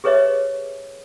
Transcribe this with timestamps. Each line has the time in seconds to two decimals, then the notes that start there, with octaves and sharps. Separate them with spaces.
0.04 G4 G#4 B4 C#5 D#5 E5